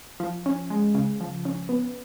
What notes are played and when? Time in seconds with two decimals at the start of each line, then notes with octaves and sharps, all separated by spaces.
0.20 F3
0.46 C#4
0.70 G#3
0.94 C#3
1.20 F3
1.45 C#4
1.69 B3